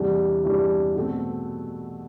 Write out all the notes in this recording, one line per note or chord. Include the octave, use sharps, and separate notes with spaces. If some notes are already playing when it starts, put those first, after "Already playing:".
Already playing: E2 C3 E3 G3 D4
E2 C3 E3 G3 D4
B2 A3 C4